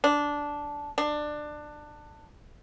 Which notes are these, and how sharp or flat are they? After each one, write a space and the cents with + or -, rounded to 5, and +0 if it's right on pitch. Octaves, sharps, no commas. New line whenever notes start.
D4 -10
D4 +20